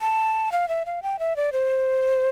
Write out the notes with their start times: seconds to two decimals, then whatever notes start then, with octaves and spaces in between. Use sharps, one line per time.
0.01 A5
0.52 F5
0.68 E5
0.86 F5
1.03 G5
1.19 E5
1.36 D5
1.53 C5